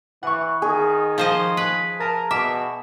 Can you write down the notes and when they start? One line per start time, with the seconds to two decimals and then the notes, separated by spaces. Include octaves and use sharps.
0.23 E3 F#5 C#6
0.62 D#3 G#4
1.18 F3 C5 D#5
1.57 B4
2.00 A#4 A5 A#6 D#7
2.31 B2 E5 D6